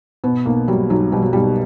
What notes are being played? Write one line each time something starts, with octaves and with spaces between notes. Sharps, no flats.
B2 B3
B1 A#3
F#3 G3
B1 F#3
B2 G3
F#3
B1 G3